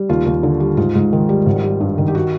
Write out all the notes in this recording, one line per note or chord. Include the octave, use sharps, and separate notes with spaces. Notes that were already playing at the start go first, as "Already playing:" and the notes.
Already playing: G3
D#2 F4
D#2
D3
G3
G#2 F4
G#2
D#3
G3
G#1
G3
G2
D#3
G4
F#4